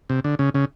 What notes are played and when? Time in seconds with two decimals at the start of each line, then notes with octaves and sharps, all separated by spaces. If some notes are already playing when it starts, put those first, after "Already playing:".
0.10 C3
0.24 D3
0.39 C#3
0.54 C#3